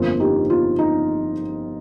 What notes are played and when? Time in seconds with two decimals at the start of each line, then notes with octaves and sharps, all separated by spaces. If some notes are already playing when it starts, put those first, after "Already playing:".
Already playing: G1 F2 F3 A#3 F4
0.20 D#4 G4
0.50 F4
0.79 D#4